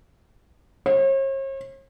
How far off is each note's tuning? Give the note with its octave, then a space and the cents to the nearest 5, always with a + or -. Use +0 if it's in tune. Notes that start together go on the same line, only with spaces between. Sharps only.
C#5 -45